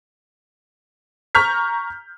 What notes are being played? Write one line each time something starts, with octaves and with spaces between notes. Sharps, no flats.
A#5 C#6 F6 G6 B6